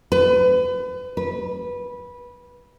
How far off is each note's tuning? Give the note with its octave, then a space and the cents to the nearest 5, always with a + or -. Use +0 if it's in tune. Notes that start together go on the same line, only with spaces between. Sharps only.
B4 +35
B4 -15